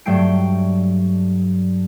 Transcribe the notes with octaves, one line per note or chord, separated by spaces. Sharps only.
G2 F#3 A3 G5 C7 D7